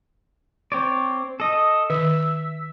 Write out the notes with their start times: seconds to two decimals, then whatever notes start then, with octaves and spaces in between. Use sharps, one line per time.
0.72 C4 C#5 D5
1.40 A4 D#5
1.90 D#3 E5